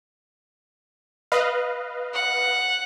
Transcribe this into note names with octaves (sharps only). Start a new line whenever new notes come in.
B4 D#5 F5
F#5